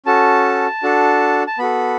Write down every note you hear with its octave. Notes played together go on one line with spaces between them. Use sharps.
C#4 F#4 A4 A5
D4 F#4 A4
A5
B3 F#4 A4 B5